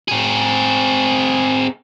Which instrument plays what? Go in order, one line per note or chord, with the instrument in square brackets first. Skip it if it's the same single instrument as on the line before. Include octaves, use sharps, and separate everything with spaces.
[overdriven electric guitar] C4 G#4